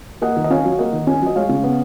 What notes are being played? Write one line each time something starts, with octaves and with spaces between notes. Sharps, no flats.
A#3 D#5 F#5
D#3
D#5
C#4 C#5 F5
F#3
A#3 D#5 F#5
D#3
C#4
F#3 D#5
G#3 C#5 F5
C#3
B3